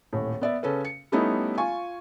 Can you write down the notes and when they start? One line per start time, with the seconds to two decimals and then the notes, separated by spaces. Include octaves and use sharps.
0.13 D#1 A2
0.41 B3 D5 E5
0.63 C#3 C#4 A4 B4
0.85 C#7
1.12 G3 A3 B3 C#4 D#4 E4
1.58 F4 G#5 C#6